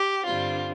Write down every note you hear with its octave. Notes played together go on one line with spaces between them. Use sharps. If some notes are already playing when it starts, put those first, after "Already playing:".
Already playing: G4
G2 D3 G3 C4 F4